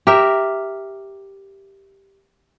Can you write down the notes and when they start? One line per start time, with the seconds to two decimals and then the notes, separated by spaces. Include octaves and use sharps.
0.07 G4 A#4 E5